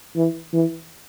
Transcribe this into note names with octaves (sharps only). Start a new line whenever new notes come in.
E3
E3